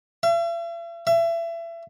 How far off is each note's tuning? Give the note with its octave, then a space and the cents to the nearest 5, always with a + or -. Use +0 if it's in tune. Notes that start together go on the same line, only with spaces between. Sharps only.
E5 +45
E5 +30